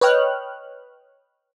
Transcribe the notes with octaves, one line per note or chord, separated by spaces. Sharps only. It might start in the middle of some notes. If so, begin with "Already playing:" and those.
B4 C#5 D#5 G5 F6 F#6